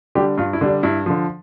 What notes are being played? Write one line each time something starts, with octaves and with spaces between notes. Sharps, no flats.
D3 G3 G4
G2 F4
E4
D3 G3
D4
G2 E4
D3 F3